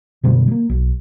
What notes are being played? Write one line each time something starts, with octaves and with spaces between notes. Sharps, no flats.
F#2 B2 D3 G3
G3 A#3
B1